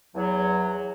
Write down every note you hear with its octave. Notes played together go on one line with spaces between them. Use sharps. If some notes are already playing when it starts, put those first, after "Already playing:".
E2 F#3